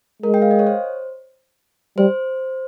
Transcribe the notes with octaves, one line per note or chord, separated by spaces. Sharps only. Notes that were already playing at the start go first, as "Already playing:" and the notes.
G#3 A#4
G5
F5
D#5
C#5
C5
G3 C5